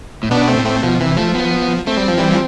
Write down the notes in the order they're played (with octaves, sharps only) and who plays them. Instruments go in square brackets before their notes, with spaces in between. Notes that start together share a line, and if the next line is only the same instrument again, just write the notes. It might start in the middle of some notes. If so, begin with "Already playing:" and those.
[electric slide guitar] A2
[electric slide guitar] B2 [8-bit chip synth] B3 D4
[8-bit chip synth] A3 C4
[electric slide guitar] A2
[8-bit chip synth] A3 C4
[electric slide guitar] B2 [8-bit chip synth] F3
[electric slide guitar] C3 [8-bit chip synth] E3
[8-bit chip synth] F3 [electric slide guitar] A3
[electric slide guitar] B3
[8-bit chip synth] A3 [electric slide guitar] C4
[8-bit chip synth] G3
F3
E3 G3
F3